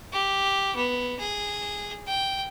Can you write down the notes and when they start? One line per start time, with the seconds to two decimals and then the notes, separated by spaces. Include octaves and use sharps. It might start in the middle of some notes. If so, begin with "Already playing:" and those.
0.13 G4
0.76 B3
1.20 G#4
2.07 G5